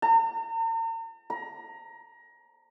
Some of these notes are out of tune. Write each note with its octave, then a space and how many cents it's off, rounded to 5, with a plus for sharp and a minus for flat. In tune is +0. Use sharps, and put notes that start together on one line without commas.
A#5 -45
A#5 +25